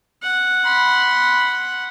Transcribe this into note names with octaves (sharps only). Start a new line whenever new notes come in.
F#5
B5 C6